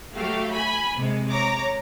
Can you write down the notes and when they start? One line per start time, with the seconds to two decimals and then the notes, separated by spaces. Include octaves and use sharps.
0.16 F#3 A3 F#4 G4 F5
0.53 G#5 B5
0.95 C3 G#3
1.31 C#5 A#5 D6